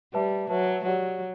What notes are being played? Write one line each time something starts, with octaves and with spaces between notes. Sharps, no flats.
G3 B4 E5 A5
F#3 B4 E5 A5
F#3 G4 D5 F#5